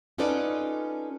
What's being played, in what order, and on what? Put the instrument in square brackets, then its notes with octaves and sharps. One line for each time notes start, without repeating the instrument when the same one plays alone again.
[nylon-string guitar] C#4 D#4 F4 A4 B4 D5